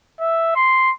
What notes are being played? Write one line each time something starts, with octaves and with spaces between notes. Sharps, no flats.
E5
C6